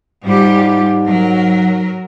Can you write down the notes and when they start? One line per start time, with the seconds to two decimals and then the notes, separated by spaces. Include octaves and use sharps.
0.24 G#2 G3 F4 G4
1.06 F#3 A#4